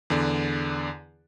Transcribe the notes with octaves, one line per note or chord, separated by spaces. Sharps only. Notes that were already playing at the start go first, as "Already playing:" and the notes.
E2 D3 D5